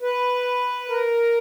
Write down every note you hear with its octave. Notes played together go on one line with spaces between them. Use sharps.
B4
A#4